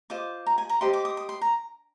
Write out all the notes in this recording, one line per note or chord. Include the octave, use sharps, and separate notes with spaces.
F4 C5 D#5 D6
A#5
G#5
A#5
G4 C5 D#5 C6
D6
D#6
D#6
C6
A#5